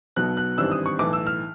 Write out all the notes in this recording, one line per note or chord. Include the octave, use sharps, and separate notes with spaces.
B1 B2 F#3 B3 F#6
F#6
G#1 G2 E3 G3 C4 E6
D#6
C#6
B1 A2 E3 D6
E6
F6